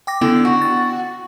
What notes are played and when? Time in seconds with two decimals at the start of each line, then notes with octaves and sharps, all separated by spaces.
0.07 G5 D6 A#6
0.21 D3 B3 E4 G5
0.45 F#4
0.62 A6